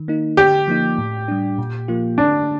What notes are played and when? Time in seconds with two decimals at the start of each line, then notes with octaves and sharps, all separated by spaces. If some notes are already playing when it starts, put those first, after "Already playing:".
Already playing: D#3
0.08 A#3 D#4
0.37 D3 G4
0.68 F3 A#3 D#4
0.98 A2
1.28 G3 D4
1.58 A#2
1.88 F3 A#3 F4
2.18 D3 D4